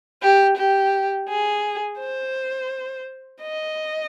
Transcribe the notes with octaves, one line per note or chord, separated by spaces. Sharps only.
G4
G4
G#4
C5
D#5